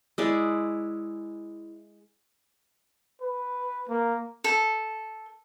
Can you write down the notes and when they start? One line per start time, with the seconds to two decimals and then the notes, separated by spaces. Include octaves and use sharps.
0.18 G#3 E4 D5
3.21 B4
3.89 A#3
4.44 A4